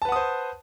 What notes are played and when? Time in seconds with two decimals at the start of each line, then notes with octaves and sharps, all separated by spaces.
0.02 A5
0.05 B4
0.09 F#5
0.12 D#6
0.16 C5